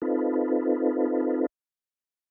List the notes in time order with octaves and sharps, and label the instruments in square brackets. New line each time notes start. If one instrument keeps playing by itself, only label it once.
[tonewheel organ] C4 D#4 F4 A4 B4